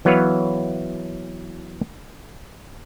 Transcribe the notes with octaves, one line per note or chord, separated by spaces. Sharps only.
E3 F#3 B3 B4 C#5 F5